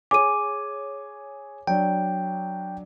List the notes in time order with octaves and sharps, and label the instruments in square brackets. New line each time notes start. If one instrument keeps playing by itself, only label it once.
[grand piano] G#4 C#5 G#5 [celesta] D6 D#7
[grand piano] F#3 D4 [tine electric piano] G5